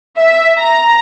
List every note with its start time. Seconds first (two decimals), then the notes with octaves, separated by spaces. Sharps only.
0.19 E5
0.60 A#5